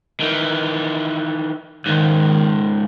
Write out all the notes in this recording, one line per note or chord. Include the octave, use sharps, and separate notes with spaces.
D#3 E3
C#2 G#2 D#3